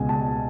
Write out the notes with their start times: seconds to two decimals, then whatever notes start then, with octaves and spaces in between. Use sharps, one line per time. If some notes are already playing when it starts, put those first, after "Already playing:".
Already playing: C#2 B2 G#3 G#5
0.09 A5